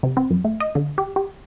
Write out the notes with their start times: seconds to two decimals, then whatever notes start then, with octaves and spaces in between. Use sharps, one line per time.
0.03 C3
0.17 C4
0.30 F#2
0.45 A3
0.60 D#5
0.75 D3
0.98 G4
1.16 G4